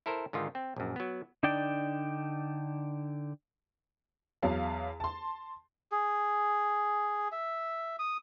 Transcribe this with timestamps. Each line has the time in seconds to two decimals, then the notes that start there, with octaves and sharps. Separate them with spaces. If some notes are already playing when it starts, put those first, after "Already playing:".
0.06 E4 A4 A#4 C5
0.33 G#2 D3 D#3 F4
0.55 C4
0.76 A#1 F#2
0.96 F#3 B3
1.43 D3 D4 D#4 D5 G5
4.42 E2 F#3 F5 A5
5.00 A5 C6
5.92 G#4
7.32 E5
7.99 D#6